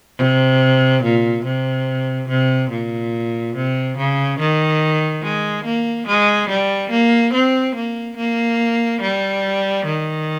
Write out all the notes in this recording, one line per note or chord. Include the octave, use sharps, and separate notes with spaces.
C3
A#2
C3
C3
A#2
C3
C#3
D#3
G#3
A#3
G#3
G3
A#3
C4
A#3
A#3
G3
D#3